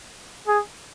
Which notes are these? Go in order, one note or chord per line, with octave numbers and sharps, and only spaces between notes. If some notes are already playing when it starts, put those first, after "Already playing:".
G#4